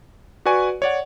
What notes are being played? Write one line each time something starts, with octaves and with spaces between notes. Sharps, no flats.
F#4 B4 D5 G#5 C#6
C#5 D5 F#5